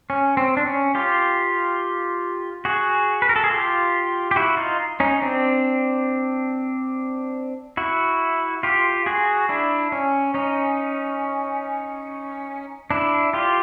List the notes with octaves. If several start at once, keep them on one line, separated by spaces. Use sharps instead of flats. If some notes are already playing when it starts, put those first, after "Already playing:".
C#4
C4
D4
C#4
F4 G4
F#4 G#4
B4
A#4
A4
G#4
F4 G4
G4
E4 F#4
D#4 F4
C#4 D#4
C4 D4
E4 F#4
F4 G4
F#4 G#4
D4 E4
C#4
C#4 D#4
D4 E4
F4 G4